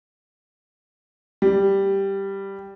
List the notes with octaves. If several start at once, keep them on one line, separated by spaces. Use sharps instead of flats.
G3